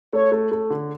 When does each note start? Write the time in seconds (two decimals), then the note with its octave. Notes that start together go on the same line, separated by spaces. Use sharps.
0.13 A3 C#5
0.32 A3
0.52 A3
0.70 D3